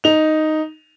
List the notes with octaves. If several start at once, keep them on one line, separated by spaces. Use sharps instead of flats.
D#4 F7